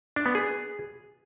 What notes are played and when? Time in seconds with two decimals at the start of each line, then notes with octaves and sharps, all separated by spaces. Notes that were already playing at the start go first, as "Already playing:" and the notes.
0.16 D4
0.26 B3
0.35 G#4